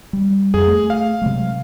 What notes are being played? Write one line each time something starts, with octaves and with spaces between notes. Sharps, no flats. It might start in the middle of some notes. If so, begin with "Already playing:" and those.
G3
F2 G#4
A3
F5
C3 F#3 G#3